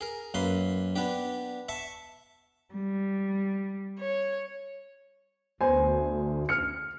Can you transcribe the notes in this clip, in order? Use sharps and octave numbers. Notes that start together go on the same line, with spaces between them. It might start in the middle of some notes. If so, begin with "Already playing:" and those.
G#4 A#4
F#2 A#3 B4 C6
B3 D4 G4
E5 A5 C#6
G3
C#5
D2 B3 C5 G#5
F6 C#7